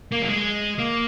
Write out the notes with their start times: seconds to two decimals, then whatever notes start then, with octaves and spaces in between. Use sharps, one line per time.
0.12 A#3
0.22 F#3
0.28 G#3
0.78 A#3